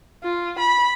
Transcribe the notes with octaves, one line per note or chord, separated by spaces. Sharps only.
F4
B5